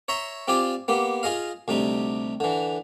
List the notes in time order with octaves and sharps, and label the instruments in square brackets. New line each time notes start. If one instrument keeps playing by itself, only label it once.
[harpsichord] C#5 E5 A#5 C6
C4 F4 G4 D5 G#5
A#3 B3 G4
F4 G#4 D#5 F5
D2 C3 G3 D#4
D3 E3